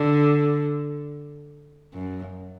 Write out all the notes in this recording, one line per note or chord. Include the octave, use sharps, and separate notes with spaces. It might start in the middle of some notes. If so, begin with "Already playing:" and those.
Already playing: D3
F#2